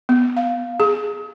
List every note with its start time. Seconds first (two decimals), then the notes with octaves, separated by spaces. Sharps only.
0.09 B3
0.37 F5
0.80 G#4